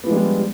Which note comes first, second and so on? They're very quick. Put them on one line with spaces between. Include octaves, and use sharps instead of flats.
B3 F3 G#3 D4 G3